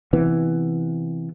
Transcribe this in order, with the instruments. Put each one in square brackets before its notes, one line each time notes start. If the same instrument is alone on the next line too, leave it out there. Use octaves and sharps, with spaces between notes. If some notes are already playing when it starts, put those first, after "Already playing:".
[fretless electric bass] C3 E3 B3